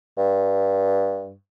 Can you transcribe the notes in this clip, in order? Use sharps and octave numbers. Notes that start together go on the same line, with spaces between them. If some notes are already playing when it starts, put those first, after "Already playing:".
G2